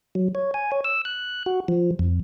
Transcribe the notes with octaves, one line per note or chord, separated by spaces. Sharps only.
F#3
C#5
G#5
C#5
E6
F#6
F#4
F3
F2